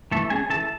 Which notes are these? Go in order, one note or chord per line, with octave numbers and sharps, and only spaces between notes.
E3 A3 A4
A3 C#4 G#4 G#5
E3 A4 A5